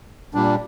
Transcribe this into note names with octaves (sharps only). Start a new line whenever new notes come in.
A#2 G3 D4